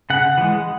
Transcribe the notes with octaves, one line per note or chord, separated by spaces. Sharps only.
C#3 F#5
E3 G#3